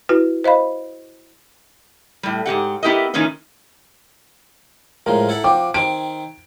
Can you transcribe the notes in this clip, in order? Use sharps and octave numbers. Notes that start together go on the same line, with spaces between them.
E4 F#4 B4
C5 D#5 F5 B5
A2 G3
G#2 D#3 G4 F#5
B3 E4 G4 A#4 D#5
A#2 D#3 E3 A#3 C#4 D#4
A2 F3 G#3 A#4
E4 A4 F#5
F3 F#4 G5 D6
D#3 C4 D7